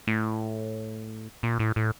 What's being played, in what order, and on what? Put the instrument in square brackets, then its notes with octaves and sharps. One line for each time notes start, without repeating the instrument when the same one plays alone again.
[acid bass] A2
A#2
A2
A2